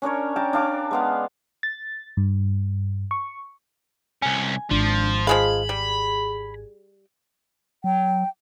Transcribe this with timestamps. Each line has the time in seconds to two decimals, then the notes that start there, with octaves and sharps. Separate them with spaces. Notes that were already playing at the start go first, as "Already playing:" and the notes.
0.02 C#4 D4 A#4 C#5
0.36 A#4 G5 A5
0.53 D4 F5 D6
0.91 G#3 B3 F5
1.63 A6
2.17 G2
3.11 C#6
4.22 C2 C#4 G#5
4.71 G#1 F3 D4
5.27 F3 G#3 G#4 F5 B5
5.69 G3
7.84 F#3 G5